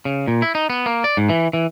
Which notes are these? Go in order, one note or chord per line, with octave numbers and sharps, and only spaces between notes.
C#3
A#2
E4
D#4
B3
A#3
D5
G#2
E3
E3